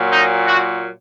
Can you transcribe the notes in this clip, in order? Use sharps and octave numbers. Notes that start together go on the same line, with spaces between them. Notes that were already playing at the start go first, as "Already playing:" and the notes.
Already playing: A#2 F#3
D#4
F#4